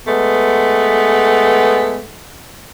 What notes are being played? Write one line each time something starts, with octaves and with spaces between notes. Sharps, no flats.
G#3 A3 B3